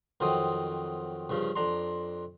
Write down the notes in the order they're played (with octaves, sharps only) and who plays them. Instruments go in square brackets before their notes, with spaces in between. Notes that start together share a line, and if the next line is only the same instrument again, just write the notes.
[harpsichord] F2 D#3 F#3 C4 D#6
G2 C#3 F3
F2 D4 A#5 C6